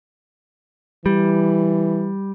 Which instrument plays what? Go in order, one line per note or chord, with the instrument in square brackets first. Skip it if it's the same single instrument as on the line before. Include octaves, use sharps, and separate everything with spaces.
[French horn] E3 [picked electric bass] G3